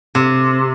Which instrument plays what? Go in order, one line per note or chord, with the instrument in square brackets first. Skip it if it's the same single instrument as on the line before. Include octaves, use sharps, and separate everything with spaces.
[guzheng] C3